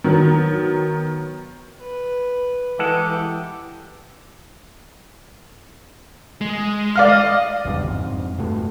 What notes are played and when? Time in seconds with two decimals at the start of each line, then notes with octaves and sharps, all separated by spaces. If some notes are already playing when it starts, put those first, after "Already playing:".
0.04 D#3 F#3 B3
1.81 B4
2.79 E3 G#3 G4 A4 F#5
6.41 G#3
6.96 D5 F5 F6
7.09 D#5
7.65 G#1 E2 G2 C#3
7.84 F2 G#2
8.38 G2 B2 A3